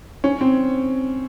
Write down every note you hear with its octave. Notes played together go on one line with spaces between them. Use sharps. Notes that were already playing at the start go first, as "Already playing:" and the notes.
C#4
C4